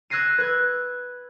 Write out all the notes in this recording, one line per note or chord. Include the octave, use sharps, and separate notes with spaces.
E6 F#6 G#6 A#6 C7 D#7
B4 F#6 G#6